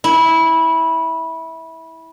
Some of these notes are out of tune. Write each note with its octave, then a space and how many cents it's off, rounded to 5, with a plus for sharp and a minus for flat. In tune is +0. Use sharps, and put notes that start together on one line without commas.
E4 -20